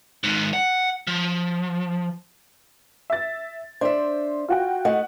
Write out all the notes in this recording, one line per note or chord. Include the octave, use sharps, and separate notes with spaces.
G#2 D#3
F#5
F3
E5 A6
D4 C5 E5
F4 F#4 G5
A3 D#4 F#5